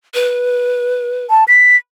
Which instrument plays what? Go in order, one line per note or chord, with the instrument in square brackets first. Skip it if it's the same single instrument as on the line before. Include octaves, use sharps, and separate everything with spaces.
[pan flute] B4
[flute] A5
B6